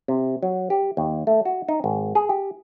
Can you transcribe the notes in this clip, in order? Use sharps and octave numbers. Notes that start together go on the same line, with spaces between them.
C3
F#3
G4
D#2
A3
F#4
D#4
G#1
G#4
G4